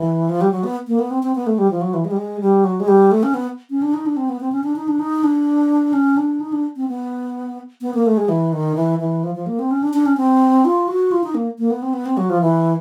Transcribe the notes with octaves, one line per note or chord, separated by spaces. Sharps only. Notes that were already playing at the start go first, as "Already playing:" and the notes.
Already playing: E3
F3
G3
F#3
B3
A#3
B3
C4
C4
B3
A3
G3
F3
F#3
E3
G#3
G3
G#3
G3
F#3
G#3
G3
A3
C#4
B3
C#4
D4
D#4
D4
C4
B3
C4
C#4
D4
D#4
D4
D#4
D4
C#4
D4
D#4
D4
C4
B3
B3
A#3
A3
G#3
E3
D#3
E3
E3
F3
F3
A#3
C4
C#4
D4
D4
C#4
C4
F4
F#4
F4
D#4
A#3
A#3
B3
C4
B3
C4
F#3
F3
E3